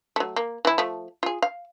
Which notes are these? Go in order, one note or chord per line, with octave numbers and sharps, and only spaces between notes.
F#3 A3
A#3
E3 E4
F3 A3
F4 G#4
F5